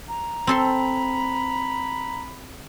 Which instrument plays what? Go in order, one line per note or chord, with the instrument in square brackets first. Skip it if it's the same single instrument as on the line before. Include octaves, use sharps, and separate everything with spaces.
[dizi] A#5
[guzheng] C4 A4 C6 [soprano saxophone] B5